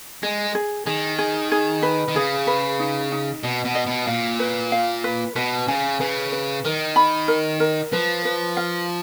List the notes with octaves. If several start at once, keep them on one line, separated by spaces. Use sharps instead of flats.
G#3 G#4
G#4
D#3 G#4
G#4
G#4
B4
D#3
C#3 G#4
B4
D#4
D#4
B2 D#5
B2
D#5
B2
A#2 F5
B4
F5
B4
B2 B4
C#3 G#5
C#3 B4
B4
D#3 A#4
B5
A#4
A#4
F3 B4
B4
F5